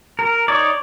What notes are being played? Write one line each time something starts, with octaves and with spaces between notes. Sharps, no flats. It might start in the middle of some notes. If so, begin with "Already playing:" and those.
A#4
D#4 C#5 D5